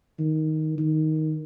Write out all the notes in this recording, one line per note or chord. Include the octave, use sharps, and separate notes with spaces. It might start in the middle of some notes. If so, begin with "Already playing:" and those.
D#3
D#3